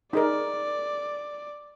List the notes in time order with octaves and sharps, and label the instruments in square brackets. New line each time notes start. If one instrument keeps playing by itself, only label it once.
[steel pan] D#4 G#4 A#4 [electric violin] D5